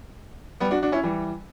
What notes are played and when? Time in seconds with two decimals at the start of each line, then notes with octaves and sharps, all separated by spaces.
0.60 G3 B3
0.71 D4 F#4
0.83 D4 F#4
0.92 C#4 E4
1.03 E3 G3